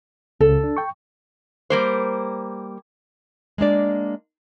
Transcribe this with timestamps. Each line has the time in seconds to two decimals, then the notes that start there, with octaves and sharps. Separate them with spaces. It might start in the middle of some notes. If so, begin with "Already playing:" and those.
0.41 C#2 C#3 A4
0.64 D4
0.77 G5 C#6
1.70 G3 A#3 C5
3.58 G#3 A#3 D4 D5